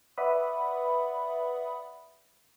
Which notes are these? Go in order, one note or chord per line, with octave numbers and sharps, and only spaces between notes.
B4 D5 E5 F#5 B5 D#6